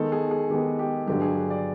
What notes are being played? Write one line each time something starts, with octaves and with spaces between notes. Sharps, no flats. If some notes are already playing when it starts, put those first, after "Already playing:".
Already playing: D#3 G#3 B3 A4
G#4
G#4
D#3 G#3 B3 G4
G4
G2 D3 F#3 G4
G#4
D5